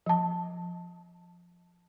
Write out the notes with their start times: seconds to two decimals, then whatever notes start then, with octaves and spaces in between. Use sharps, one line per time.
0.06 F3 A5